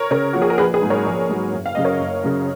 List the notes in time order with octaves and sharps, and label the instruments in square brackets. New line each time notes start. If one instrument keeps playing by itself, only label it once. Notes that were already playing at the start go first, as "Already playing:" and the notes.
Already playing: [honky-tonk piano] A#4 C#5
[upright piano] C#3 [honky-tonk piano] A#4 C#5
[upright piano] F3 A#3 F4 [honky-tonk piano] F#4
[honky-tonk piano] G#4
A#4
[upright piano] A#1 [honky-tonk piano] G#4 B4
[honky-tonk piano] G#4 B4
[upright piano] G#2 F#3 A#3
[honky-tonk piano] A#4 C#5
[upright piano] A#1
G#2 F#3 A#3
F#1
[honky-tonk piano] F5
[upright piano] F#2 C#3 [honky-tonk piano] D#5
[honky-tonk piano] A#4 C#5
[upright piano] F#1
F#2 C#3